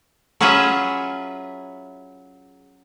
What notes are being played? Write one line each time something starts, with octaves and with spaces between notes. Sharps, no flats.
F#3 C#4 F4 G#4 B4 E5